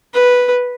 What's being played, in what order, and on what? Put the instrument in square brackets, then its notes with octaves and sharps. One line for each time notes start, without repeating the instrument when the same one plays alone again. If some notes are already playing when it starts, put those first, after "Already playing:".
[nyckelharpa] B4